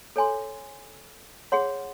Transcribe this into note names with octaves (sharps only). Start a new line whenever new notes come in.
A4 C#5 G#5 C6
G#4 C#5 F#5 C6